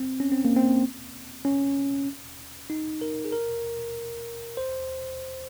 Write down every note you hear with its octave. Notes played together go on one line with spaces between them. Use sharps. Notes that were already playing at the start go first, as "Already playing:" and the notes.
Already playing: C4
C#4
C4
A#3
C4
C#4
D#4
A#4
G#4
A#4
C5